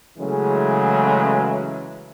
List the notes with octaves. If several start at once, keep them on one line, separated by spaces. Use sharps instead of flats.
C#3 E3 F#3 G#3 A3